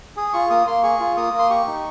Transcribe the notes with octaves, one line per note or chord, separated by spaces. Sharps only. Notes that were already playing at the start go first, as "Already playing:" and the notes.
G#4 D#6
F4 C#6
A#3 D#6
A#3 C6
G#4 C#6
F4
A#3 D#6
A#3
C6
G4 C#6
D#4